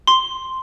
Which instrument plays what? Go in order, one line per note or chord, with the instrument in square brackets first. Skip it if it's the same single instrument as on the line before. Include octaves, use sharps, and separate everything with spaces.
[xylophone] C6